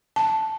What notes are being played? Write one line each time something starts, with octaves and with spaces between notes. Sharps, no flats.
A5